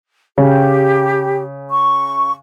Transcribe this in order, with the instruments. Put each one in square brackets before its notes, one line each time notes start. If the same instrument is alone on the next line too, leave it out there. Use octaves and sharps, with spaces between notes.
[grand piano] C#3 [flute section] G4
[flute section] C#6